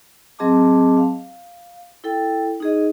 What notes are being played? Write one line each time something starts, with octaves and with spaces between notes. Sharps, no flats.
F#3 C4 G#4 D#5 A5 D6
F5
E4 A4 G5
D#4 G#4 D#5